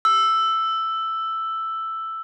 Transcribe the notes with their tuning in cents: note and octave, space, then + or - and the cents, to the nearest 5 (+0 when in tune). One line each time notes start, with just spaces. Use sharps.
E6 +5